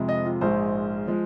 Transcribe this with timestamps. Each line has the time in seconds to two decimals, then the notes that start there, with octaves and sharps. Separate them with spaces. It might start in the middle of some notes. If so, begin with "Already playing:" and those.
Already playing: F2 C3 G#3
0.09 D#5
0.26 F4
0.41 A#1 G#2 G#3 C5
1.07 F3 G#3